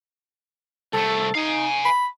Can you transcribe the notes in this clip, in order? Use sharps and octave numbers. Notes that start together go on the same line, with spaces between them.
C2 A3 A4
D#4 F5 G#5
B5